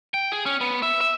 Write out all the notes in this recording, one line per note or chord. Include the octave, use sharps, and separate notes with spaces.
G5
G#4
C#4
B3
E5
E5